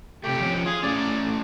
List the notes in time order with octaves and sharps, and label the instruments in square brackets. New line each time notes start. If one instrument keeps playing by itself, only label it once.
[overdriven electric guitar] C3 A3 [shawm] G4
[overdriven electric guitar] F3 C#4
[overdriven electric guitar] F4 [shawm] G#4
[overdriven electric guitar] A2 C#4 [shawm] D5